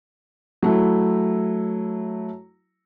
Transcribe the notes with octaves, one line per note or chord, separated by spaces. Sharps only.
F#3 A3 E4